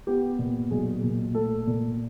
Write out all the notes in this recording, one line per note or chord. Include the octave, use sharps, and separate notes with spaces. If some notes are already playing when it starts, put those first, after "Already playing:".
B3 G4
A#2
B1 G#4
A#2
A3 A4
A#2